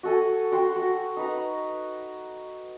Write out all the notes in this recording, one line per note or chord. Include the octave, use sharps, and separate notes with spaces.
F#4 A4 G#5
F#4 G5 C6
F#4
D#4 B4 A#5